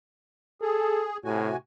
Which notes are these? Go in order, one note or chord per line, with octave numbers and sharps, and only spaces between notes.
G#4 A4
A2 C3 F#4 G#5